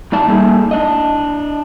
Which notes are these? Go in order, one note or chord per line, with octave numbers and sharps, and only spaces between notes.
A2 D#4 D5 A5
G3 A3 A#3 D#4 G#4
D4 D#5